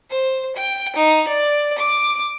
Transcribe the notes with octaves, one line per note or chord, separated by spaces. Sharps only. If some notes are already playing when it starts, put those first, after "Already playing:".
C5
G5
D#4
D5
D6